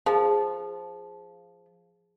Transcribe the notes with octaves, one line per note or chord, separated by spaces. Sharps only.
F3 G#4